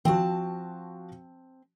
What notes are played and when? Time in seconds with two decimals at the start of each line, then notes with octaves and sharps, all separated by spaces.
0.05 F3 C4 F#4 A5